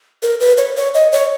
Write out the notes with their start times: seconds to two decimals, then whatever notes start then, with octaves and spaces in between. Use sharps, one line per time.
0.23 A#4
0.40 B4
0.58 C#5
0.77 C#5
0.94 D#5
1.12 C#5